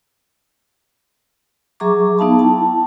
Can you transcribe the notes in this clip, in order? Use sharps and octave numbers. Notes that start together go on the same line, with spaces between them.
F#3 G#4 E5 A#5 C#6 D6
B3 D#4 F5 A5 B5
E4 G5 A5